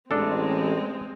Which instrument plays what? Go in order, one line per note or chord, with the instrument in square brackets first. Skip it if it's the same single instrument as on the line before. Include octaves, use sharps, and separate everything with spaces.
[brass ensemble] A1 [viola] G#3 C4 [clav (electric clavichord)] D4 A4